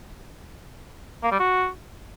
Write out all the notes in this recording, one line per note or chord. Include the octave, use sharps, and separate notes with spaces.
A#3
G3
F#4